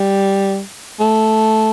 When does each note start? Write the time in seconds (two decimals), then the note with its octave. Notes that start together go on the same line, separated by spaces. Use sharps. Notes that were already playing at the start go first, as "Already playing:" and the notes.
Already playing: G3
1.00 A3